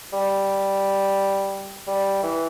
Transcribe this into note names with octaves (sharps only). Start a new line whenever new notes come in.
G3
G3
E3